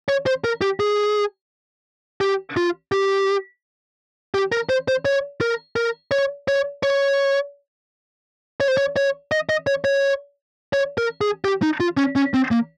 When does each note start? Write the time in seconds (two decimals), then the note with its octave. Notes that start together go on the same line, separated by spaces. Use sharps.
0.09 C#5
0.26 C5
0.44 A#4
0.61 G4
0.80 G#4
2.21 G4
2.57 F4
2.92 G4
4.34 G4
4.52 A#4
4.69 C5
4.88 C5
5.05 C#5
5.41 A#4
5.76 A#4
6.11 C#5
6.48 C#5
6.83 C#5
8.60 C#5
8.68 C5
8.77 C#5
8.96 C#5
9.32 D#5
9.49 D#5
9.67 C#5
9.85 C#5
10.73 C#5
10.98 A#4
11.21 G#4
11.45 G4
11.62 D#4
11.80 F4
11.97 C#4
12.16 C#4
12.34 C4
12.51 A#3